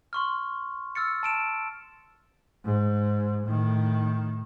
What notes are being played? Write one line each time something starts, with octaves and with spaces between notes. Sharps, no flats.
C6 C#6 F6
E6 F6 A6 C#7
A5 D7 E7
G#2
A2 D#3